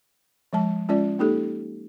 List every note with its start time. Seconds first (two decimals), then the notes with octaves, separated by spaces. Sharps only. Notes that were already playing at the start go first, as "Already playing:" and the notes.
0.53 F3 G#3 A5
0.89 G#3 C#4 F4 D5
1.19 A#3 D#4 G4 A4